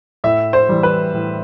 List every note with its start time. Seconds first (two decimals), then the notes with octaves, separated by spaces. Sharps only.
0.24 A2 E5
0.53 C5
0.69 E3 G3
0.83 B4
1.13 A2